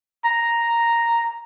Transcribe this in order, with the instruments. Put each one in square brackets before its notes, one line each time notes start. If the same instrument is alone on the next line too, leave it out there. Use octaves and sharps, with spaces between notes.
[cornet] A#5